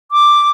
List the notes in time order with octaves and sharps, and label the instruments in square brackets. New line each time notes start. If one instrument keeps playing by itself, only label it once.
[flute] D6